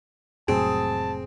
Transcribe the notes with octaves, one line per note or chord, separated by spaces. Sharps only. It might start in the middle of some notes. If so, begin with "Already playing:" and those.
F1 A2 F#3 C4 G#4 A5